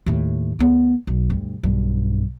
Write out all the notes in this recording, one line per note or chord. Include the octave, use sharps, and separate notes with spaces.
D#2 A2
D2 B3
B1
D2 G2
B1 G2